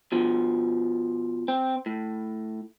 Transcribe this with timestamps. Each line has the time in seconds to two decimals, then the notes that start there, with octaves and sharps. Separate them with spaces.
0.12 B2 F3
1.48 C4
1.86 A2